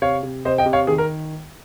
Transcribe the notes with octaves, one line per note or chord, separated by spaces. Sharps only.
C3 C#5 F5
C3
C3 C5 D#5
D#5 G5
C3
C#5 F5
D#3 G#4
A#4